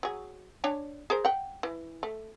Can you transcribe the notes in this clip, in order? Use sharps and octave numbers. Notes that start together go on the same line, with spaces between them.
F#3 G#4
D4 C#5 G#5
G#4 A#4 C5
F#5 G5
E3
A3